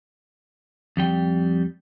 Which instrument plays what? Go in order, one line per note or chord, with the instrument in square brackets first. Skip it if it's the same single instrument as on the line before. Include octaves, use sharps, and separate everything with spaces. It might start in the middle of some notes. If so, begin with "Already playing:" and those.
[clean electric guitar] F2 G3 G5